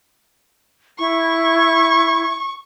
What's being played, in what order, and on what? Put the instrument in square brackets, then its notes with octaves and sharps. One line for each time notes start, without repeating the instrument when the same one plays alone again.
[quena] E4 [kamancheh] C#6